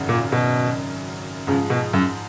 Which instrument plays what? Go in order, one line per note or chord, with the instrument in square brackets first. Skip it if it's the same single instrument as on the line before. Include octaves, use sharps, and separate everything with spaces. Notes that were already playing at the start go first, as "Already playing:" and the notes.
Already playing: [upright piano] G#1 F#2 C#3
[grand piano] A#2
B2
[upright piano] G#2 F3 G#3 [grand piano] C#3
[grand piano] B2
F#2